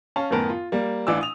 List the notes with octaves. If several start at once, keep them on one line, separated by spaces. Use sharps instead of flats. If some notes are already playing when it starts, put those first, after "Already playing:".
C#4 F5 A5
F#2 A2 D#3 B3 A#4 A5
F4
G3 A#3
A1 E3 D4 F5 D6 E6
D#6 F7